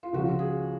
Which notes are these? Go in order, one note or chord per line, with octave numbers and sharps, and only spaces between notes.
F4
C#2 C#3 F3 F#4
G#4